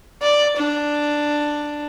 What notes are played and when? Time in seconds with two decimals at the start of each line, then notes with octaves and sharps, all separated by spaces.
0.22 D5
0.57 D4